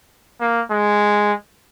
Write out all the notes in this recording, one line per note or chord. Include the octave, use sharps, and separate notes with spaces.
A#3
G#3